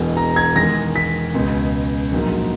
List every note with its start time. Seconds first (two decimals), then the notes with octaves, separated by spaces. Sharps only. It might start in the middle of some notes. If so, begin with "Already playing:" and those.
Already playing: E1 E2 B2
0.17 A#5
0.36 G#6
0.56 E2 D#3 G#3 A#6
0.96 B6
1.34 C#2 B2 G#3
2.12 A#1 G#2 F#3 A#3